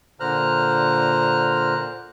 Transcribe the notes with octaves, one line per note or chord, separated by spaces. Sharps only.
A#2 D3 C5 A#5 F6 F#6